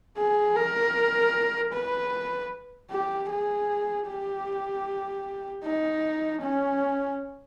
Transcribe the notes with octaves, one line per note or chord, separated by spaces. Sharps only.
G#4
A#4
B4
G4
G#4
G4
D#4
C#4